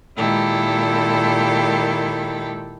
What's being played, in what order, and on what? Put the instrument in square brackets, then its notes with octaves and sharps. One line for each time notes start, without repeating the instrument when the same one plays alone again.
[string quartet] A#2 D#3 G#3 E4 G4 A4